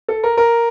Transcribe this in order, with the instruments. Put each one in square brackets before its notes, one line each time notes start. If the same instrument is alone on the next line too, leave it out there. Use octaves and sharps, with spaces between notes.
[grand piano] A4
A#4
A#4